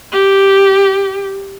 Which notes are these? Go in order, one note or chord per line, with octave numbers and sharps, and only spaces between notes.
G4